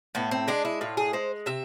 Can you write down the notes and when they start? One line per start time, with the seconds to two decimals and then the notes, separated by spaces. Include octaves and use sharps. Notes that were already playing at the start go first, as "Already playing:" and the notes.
0.15 A2 B3
0.31 C4
0.48 G#3 D4
0.65 E4
0.81 A2 F4
0.97 G#4
1.13 G#3 C5
1.46 C3 E5